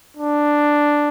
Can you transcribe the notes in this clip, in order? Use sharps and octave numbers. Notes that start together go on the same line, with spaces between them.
D4